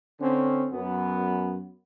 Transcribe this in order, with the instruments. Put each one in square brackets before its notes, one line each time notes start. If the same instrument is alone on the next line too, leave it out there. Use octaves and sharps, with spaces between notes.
[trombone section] D3 C4 C#4
F#2 B3